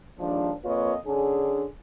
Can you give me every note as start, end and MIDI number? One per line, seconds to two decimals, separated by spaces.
0.19 0.51 39
0.19 0.51 44
0.19 0.51 51
0.19 0.51 53
0.19 0.51 62
0.64 0.94 41
0.64 0.94 58
0.64 0.94 65
0.64 0.94 71
0.64 0.94 73
0.64 0.94 75
1.06 1.65 50
1.06 1.65 61
1.06 1.65 62
1.06 1.65 68